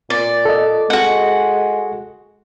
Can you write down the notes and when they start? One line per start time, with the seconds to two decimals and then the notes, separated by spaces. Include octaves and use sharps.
0.10 A#2 D5
0.45 A4 D#5
0.90 G#3 F#4 F#5